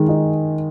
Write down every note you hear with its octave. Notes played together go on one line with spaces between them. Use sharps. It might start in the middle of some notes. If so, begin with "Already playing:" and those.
Already playing: D#3 G#3
D#4